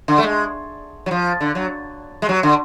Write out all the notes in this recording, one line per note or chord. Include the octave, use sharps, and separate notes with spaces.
D3
A3
G#3
F#3
F3
D3
F#3
G#3
F#3
D3